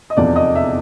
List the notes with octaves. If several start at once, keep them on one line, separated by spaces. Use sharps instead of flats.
D#5
F1 E2 C3 F3 D5
D#5
E5